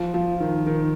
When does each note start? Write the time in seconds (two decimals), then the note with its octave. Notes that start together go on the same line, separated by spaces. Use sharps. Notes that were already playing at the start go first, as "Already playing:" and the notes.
Already playing: F3
0.14 F3
0.40 D#3
0.67 D#3